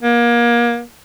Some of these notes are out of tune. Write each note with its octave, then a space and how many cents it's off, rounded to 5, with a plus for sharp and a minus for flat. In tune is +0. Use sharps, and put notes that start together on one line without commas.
A#3 +30